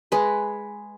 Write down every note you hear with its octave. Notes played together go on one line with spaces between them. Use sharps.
G#3 B4